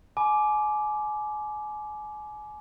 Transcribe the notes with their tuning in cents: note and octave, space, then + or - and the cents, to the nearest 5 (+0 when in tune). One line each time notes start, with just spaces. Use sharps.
G#5 +30 B5 -15 D6 +0